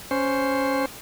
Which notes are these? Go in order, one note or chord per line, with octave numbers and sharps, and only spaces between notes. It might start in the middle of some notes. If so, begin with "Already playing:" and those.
C#4 C5